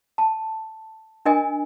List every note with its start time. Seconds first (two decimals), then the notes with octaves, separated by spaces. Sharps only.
0.18 A5
1.26 D4 A#4 D#5 G#5